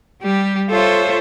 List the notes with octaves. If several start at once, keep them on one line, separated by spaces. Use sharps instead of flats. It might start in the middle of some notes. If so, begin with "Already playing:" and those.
G3 G4
F4 A4 C5 C#5 E5